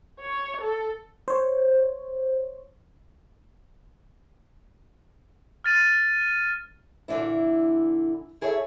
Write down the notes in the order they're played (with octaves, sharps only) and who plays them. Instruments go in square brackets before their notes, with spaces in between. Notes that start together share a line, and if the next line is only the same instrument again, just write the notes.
[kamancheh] C#5
A4
[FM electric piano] C5 C#5
[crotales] F6 A6 D#7
[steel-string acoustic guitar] A#2 D3 E3 D4 E4
E4 G#4 A4 C#5 D5 E5